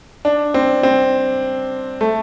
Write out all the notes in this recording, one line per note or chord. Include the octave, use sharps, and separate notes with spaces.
D4
C4
C4
A3